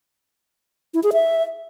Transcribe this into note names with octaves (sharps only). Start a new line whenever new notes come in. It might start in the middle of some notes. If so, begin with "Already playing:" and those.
E4
G#4
E5